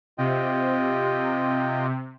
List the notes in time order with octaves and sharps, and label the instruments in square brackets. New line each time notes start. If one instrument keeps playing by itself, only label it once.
[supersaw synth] C3 [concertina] F4 D#5 G5